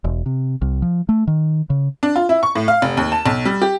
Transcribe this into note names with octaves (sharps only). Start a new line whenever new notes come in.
E1
C3
C2
F3
A3
D#3
C#3
D4
F4
E4
C#6
A2
F5
F1
D#2
A5
B1
G3
G4